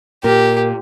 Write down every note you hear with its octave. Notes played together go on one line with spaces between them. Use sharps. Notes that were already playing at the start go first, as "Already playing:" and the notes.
A#2 G4 A#4